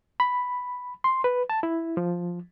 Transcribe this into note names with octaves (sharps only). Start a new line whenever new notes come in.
B5
C6
B4
A5
E4
F3